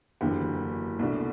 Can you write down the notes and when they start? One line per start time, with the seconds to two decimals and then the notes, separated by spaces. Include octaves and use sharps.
0.21 F#1 E2 D3 G4
0.99 C2 B2 A3 D4